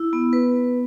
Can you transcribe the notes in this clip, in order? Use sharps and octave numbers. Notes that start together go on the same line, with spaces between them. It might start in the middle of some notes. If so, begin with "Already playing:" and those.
Already playing: E4
B3
B4
B3